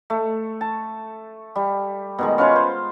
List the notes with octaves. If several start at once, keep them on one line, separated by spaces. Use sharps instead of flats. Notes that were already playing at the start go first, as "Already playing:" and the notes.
A3
A5
G3
B2 D#3 G#3
C#4 F4 B4 C#5
C5